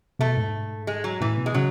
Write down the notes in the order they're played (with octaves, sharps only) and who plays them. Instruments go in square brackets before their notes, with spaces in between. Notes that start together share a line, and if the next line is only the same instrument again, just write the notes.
[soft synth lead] B2 [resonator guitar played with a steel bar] A3
[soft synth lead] G#2
[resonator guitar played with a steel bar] G#3
F#3
[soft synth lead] A2 [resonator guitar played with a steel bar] E3
[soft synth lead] B2
[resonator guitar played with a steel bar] G#3
[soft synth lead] C#3 [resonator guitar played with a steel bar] F#3